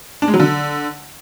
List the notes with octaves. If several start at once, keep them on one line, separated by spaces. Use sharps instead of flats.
D4
G#3
F#3
D3